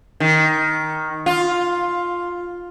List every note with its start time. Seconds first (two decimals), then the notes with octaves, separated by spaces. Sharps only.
0.20 D#3
1.26 F4